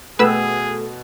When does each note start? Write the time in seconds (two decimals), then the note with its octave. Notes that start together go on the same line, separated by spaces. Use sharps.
0.19 B2 A3 G#4 B4 G5 E6